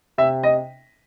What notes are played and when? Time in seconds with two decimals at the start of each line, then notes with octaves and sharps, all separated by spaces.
0.18 C3 E5
0.43 D#5